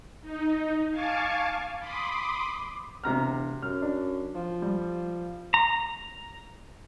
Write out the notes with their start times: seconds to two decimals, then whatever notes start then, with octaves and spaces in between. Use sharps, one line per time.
0.22 D#4
0.90 F5 G#5 A5 C#6 D6
1.79 B5 C6 D6 D#6
3.04 E1 C3 A#5 F6
3.62 F#2 F6
3.82 D4
4.35 F3
4.62 G3
5.54 A#5